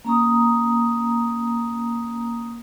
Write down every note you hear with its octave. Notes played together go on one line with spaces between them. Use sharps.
A#3 C#4 A#5 C#6 D#6